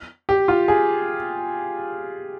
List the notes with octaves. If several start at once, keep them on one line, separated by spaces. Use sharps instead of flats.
G4
F4
G#4